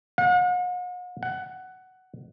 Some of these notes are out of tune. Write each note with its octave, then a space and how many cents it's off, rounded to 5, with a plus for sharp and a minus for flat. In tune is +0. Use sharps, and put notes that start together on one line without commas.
F#5 -45
F#5 +10